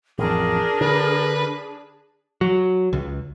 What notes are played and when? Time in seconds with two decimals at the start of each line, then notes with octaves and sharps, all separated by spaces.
0.19 A1 F2 D4 G#4 A#4
0.81 D3 B4
2.41 F#3
2.93 C#2